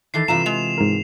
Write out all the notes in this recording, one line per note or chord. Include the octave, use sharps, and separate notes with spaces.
D#3 E3 A4 C7
G2 C3 E3 F4 E5 A#5 E7
G#3 F7
G#2 A#4